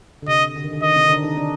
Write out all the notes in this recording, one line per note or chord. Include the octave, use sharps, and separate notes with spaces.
D3
C3 D#5
D3
D#3
D3
D#3 D#5
C3 C4
D#4
D3 D4
D#3 D#4
D3 D4